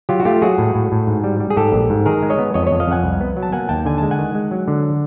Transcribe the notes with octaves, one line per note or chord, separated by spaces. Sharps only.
F#3 F4 G4
F#4
A3 F4 G4
F#3 F#4 G#4
A2
A2
A2
G#2
G3
G3
G#4
G#2 G4 A4
A#1
G#2
D#3 G#4 A#4
G#3
C#5 D#5
B3
F2 C#5 D#5
F2 C#5 D#5
D#5 F5
F2 F#5 G#5
C2
B3
F#3
A5
A#3 F#5 G#5
D#2 G5 A5
D3 G#5
G#3 A5
F#5 G#5
D#3
G#3
F#3
D3